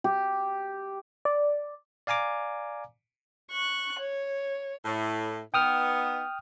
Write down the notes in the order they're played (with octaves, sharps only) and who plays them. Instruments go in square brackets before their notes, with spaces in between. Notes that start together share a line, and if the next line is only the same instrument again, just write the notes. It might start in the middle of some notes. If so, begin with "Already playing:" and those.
[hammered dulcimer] G4
[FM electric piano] D5
[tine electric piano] D5 F5 G#5 A#5 D6
[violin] C#6 F#6
C#5
[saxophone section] A2
[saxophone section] B3 D#4 [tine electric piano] G5 D#6 F6